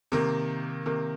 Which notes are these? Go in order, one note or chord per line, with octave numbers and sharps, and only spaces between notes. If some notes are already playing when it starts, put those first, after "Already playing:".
C3 D#3 A#3
C3 D#3 A#3